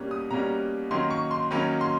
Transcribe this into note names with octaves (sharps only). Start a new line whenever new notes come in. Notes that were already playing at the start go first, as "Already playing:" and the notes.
Already playing: B2 G3 A#3 C#4
D#6
B2 G3 A#3 C#4 A#5
D#3 F#3 A#3 C#4 C6
C#6
C6
D#3 F#3 A#3 C#4 B5
C6